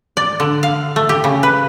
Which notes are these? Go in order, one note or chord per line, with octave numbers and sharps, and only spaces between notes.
D5
D3
F5
A3
G4
C#3
B4